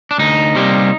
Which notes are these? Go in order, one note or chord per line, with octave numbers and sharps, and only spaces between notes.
D4
D2 D#4
C3 G3 A#3